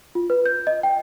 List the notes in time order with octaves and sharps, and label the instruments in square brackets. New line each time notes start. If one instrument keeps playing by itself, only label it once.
[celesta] F4
B4
G6
D#5
G5